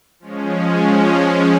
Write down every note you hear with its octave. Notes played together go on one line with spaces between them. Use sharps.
F3 G#3 C#4